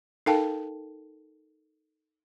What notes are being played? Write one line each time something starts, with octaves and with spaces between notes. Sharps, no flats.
D#4 A4 A#4 F5 G5 A5